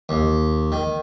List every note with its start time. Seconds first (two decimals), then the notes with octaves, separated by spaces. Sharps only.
0.09 D#2
0.72 D#3